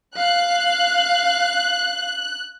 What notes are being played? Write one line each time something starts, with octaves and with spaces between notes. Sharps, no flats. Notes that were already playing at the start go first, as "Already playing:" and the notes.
F5 F#6